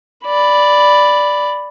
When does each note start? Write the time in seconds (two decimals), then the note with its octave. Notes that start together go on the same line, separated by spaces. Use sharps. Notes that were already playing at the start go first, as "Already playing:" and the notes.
0.25 D5 B5